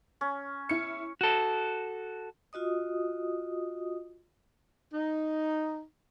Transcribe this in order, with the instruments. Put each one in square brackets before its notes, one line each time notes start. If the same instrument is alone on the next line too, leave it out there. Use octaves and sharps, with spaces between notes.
[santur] C#4
[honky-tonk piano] E4 C#7
[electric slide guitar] F#4 A4
[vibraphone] F4 F#4 D#5 D#6
[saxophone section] D#4